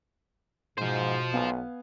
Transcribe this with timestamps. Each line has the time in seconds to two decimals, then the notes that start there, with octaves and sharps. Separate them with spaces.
0.78 G#2 B2 F4 C5
1.33 B1 B3 F5 G#5